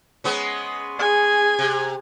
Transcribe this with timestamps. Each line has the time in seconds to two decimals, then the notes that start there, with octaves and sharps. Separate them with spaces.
0.24 G#3 B3 C#4
0.99 G#4 G#5
1.59 C3